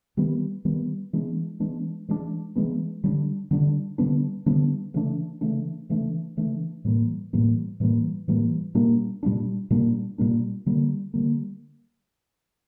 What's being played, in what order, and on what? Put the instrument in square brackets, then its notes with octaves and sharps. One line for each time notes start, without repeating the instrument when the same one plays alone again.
[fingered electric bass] D#3 G3 B3
D#3 G3 B3
E3 G#3 B3 D4
E3 G#3 B3 D4
E3 G#3 B3 D4
E3 G#3 B3 D4
D3 G3 B3 D4
D3 G3 B3 D4
D3 G3 B3 D4
D3 G3 B3 D4
C#3 E3 A3 D4
C#3 E3 A3 D4
C#3 E3 A3 D4
C#3 E3 A3 D4
A2 E3 G3 A#3
A2 E3 G3 A#3
A2 E3 G3 A#3
A2 E3 G3 A#3
A#2 G3 A#3 D4
A#2 G3 A#3 D4
A#2 G3 A#3 D4
A#2 G3 A#3 D4
D3 G3 A#3
D3 G3 A#3